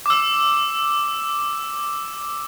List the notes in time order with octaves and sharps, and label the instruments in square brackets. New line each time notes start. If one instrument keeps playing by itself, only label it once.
[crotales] D6 E6